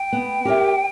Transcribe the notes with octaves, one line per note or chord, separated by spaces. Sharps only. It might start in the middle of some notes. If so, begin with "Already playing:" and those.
Already playing: G5
B3
G4 A#4 C#5 E5